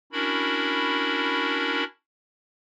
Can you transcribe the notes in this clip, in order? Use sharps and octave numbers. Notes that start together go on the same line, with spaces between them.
C#4 D4 E4 F#4 A#4 B5